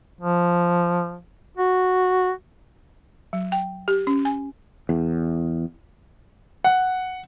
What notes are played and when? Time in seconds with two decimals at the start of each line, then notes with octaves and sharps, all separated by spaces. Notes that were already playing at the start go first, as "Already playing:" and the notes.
0.21 F3
1.57 F#4
3.33 F#3
3.52 G5
3.88 G4
4.07 C#4
4.25 G#5
4.89 E2
6.64 F#5